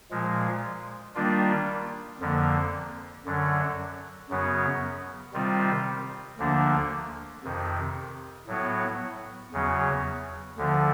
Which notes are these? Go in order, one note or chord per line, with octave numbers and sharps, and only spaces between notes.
A#2 F3 G#3
D#3 G3 A#3 D4 F4
F2 D3 F3 A#3
F#2 D3 F#3
F#2 C#3 F#3 B3
C3 D#3 G3 C4 F4
D2 D3 F3 A#3 D4
F2 C3 D#3
A2 F#3 B3
E2 C#3 F#3
D2 D3 F3